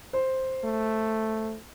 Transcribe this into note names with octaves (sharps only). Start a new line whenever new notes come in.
C5
A3